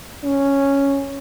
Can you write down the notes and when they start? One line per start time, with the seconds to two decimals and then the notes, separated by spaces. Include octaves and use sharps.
0.24 C#4